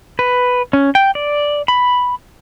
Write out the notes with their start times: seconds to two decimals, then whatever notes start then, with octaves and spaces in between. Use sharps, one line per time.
0.19 B4
0.73 C#4
0.95 G5
1.15 D5
1.68 B5